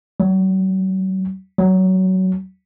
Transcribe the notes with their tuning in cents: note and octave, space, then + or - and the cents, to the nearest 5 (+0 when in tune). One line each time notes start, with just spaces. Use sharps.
F#3 +40
F#3 +20